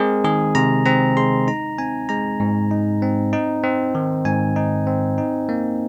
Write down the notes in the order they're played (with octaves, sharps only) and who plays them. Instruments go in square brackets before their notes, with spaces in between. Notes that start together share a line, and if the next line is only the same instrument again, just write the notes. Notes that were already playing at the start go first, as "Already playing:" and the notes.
Already playing: [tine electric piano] G#3 C4 G#4 A#4
D#3 G#4
C3 A#5
C4 A#5
G#3 C6
D#4 A#5
C4 G#5
G#3 A#5
G#2
D#4
C4
D#4
C4
D#3
G#2 G#5
D#4
C4
D#4
A#3